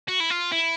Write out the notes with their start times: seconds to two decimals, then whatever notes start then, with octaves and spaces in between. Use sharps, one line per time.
0.08 F#4
0.20 E4
0.30 F4
0.52 E4